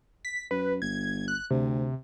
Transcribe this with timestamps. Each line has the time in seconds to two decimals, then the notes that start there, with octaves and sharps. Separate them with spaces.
0.25 B6
0.51 F#2 B4
0.82 G1 G#6
1.28 F#6
1.50 D2 C3